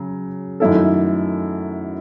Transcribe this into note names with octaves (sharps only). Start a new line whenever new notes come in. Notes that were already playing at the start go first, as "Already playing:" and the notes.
Already playing: C#3 F#3
F#2 D#3 A3 E4 A4